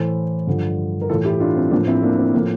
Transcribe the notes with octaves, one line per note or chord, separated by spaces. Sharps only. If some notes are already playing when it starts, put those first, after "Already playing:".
Already playing: A2 E3 A4 C5
G2 D3 F3
A#4
A2 E3 F4 A4
E4 G4
D4 F4
C4
A2 F3 A#3 D4
C4 E4
A#3 D4
C4
A2 F3 A#3